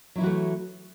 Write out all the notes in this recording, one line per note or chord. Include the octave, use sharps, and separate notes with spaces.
E3 F#3 A3 E4 F#4